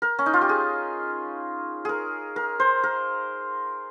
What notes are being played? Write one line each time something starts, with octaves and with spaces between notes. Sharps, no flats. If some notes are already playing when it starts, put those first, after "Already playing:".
A#4
C#4
D#4
F4
G4
G#4
G#4 A#4
A#4
C5
A#4